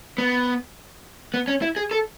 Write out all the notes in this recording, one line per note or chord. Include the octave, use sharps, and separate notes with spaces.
B3
B3
C#4
E4
G#4
A4